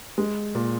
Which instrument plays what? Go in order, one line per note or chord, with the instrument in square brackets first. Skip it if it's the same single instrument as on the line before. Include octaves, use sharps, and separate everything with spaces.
[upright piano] G#3
A#2